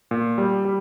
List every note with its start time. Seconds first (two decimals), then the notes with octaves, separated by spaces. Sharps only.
0.11 A#2
0.38 G3
0.65 G3